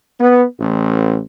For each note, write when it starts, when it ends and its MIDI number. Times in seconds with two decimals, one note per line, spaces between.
0.21 0.44 59
0.59 1.20 33